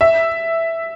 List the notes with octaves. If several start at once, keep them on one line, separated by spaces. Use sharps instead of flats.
E5